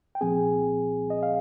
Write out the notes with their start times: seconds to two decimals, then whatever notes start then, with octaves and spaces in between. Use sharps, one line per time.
0.15 G5
0.21 C2 A#2 F3 C4 G#4 G#5
1.10 D#5
1.23 F5